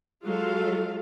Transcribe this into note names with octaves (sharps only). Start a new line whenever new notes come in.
F#3 G#3 F4 A4 F5